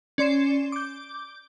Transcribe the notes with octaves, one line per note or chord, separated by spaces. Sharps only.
C#4 D5 C6 C7 E7
D6 G6